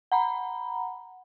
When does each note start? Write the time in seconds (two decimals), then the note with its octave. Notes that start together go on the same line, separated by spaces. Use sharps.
0.12 F#5 A#5 B5